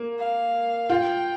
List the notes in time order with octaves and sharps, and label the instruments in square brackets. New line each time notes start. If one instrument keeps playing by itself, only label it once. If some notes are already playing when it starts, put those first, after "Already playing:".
Already playing: [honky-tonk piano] A#3
[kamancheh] F5
[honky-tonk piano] F4 [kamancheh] G5